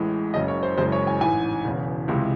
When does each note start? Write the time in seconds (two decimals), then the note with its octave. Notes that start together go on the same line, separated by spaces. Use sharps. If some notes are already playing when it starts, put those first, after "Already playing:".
Already playing: A1 A2 G#3
0.34 F#1 F#2 C#3 D#5
0.48 C#5
0.63 C5
0.77 F#1 F#2 E3 G#3 C5
0.92 C#5
1.07 G#5
1.21 A1 G#2 E3 G#5
1.65 E1 E2 C#3
2.08 C#2 C3 E3 G#3